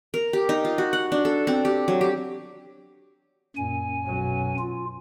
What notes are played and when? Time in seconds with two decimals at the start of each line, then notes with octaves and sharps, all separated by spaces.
0.14 A#4
0.33 G4
0.49 D#4
0.65 F4
0.78 F#4
0.93 F#5
1.12 D4
1.25 A4
1.47 C4
1.65 G4
1.88 F#3
2.01 G4
3.56 F#2 A#2 G#5
4.07 B1 F#3 C#4
4.59 F4